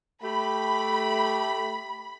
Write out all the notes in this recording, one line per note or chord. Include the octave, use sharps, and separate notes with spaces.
A3 G4 B5